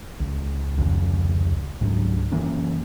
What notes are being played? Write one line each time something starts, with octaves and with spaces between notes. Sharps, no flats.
C#2
F1 C#2
C#2 G#2 F#3 D4
F#1 E3 A#3 C#4